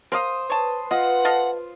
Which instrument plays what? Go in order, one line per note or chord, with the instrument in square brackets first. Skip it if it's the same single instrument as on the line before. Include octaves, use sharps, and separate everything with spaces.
[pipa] A#4 F5 [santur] C5 D#6
[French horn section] B4 [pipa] C#5 A5
[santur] F4 [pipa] D#5 [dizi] F#5
[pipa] A4 D#5 F5